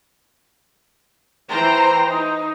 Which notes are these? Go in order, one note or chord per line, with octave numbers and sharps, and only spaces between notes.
E3 C5 G5 A#5 C6
D#4